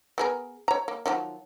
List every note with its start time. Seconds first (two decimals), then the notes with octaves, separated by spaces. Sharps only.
0.18 B3 G#4 A#4
0.68 C#5 A#5
0.88 A#3
1.06 D#3 F3 F#3